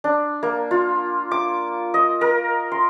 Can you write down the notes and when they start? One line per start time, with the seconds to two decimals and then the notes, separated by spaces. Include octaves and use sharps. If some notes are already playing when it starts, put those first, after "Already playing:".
0.04 D4
0.43 A#3
0.71 F4
1.31 D6
1.94 D#5
2.21 A#4
2.72 C6